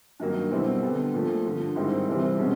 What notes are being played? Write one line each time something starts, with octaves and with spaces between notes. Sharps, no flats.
G2 D#3 F#3 A#3
B2 G3 C4 E4
D3 G3 B3
A#2 F3 A3
G2 D3 F3
G#2 D#3 G3 C4 E4
C2 C3 E3 G3 C4
B2 G#3 C#4